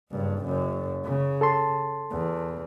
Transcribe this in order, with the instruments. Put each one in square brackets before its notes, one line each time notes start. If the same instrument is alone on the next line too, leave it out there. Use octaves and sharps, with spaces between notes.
[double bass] F#1 G2
F#1 F#2
C#3
[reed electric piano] A4 A5 C6
[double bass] E2